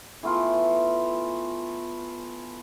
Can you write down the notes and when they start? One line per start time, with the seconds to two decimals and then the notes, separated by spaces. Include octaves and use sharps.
0.23 E3 A3 B3 F4